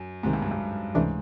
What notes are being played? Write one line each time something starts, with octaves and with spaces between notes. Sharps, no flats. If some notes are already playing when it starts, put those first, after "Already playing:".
Already playing: F#2
C2 G#2 C3 D#3
G2
F#2
G2
C#2 G#2 C3 E3 A3 D4